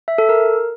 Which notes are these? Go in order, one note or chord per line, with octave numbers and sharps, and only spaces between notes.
E5
A4
A#4